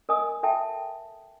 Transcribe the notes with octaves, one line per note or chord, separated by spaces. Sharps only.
A#4 D#5 G#5 D#6
A4 E5 G5 A5